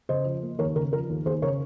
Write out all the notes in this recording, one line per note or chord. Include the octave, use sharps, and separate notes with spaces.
C#3 C5 D#5
F3
A#3
D#2 A#4 C#5
C#3 A#4
F3 A#4
D#2
D#2 G#4 C5
C#3 A#4 C#5